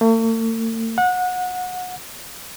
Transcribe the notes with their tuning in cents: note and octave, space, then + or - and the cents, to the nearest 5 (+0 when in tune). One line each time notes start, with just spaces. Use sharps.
A3 +45
F#5 -25